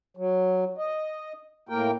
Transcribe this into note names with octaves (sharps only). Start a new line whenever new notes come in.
F#3
D#5
A2 A#3 A#4 G5